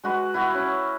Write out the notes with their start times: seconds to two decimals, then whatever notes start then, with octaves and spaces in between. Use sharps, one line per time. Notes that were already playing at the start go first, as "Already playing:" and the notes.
0.04 G#3 F#4 B4
0.34 E4 F#4 F5
0.54 C#4